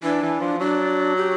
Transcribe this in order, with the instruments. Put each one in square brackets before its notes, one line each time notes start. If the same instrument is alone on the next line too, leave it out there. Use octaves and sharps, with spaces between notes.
[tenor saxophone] E3 [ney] D4
[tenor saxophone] E3
F3
[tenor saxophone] F#3 [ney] D4
[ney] G4